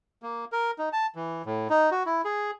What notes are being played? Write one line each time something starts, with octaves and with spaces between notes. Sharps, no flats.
A#3
A#4
D#4
A5
E3
A2
D#4
F#4
E4
G#4